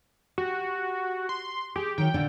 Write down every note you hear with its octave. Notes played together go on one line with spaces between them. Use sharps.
F#4 G4
C6
G4 G#4
D#3 F#3 A#4 G5
A#2 D3 D4